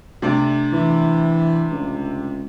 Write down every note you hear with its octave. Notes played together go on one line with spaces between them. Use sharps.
C3 A3 D4
E3
C#2